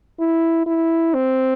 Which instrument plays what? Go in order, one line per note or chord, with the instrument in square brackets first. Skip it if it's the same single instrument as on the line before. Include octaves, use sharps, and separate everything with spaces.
[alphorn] E4
E4
C4